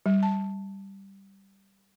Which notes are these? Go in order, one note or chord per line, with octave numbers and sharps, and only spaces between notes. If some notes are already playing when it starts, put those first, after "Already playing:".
G3
A5